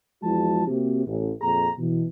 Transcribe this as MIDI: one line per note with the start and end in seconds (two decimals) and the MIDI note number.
0.23 0.65 40
0.23 0.65 53
0.23 0.65 56
0.23 0.65 64
0.23 0.65 66
0.23 0.65 81
0.67 1.04 48
0.67 1.04 58
0.67 1.04 60
0.67 1.04 66
0.67 1.04 67
1.07 1.31 33
1.41 1.68 41
1.41 1.68 46
1.41 1.68 68
1.41 1.68 82
1.78 2.04 47
1.78 2.04 52